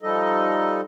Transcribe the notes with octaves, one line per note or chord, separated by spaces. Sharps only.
F3 G3 D#4 A4 D#5